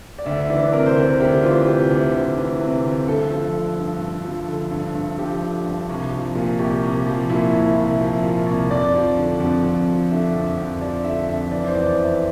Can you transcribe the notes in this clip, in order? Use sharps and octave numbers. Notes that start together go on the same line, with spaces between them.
D5
D2 E5
E3 D5
C3 A#4
C5
D2 A#4
D2 G4
E3 F4
C3 G4
D2
D2
E3
C3
D2
G2 A4
F3
D3
G2
G2
F3
D3 A4
G2
G2
F3 G4
D3
G2
C2
F3
A#2
C2 G4
C2
F3
A#2 E4
C2
C2
F3
A#2
C2
F2 D5
F3
D3
F2
F2
F3
D3 E5
F2
F2
F3 D5
D3 E5
F2 E5
E3 D5
C5
E2 D5
E3 E5